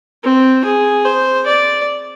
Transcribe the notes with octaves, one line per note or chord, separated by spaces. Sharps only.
C4
G#4
C5
D5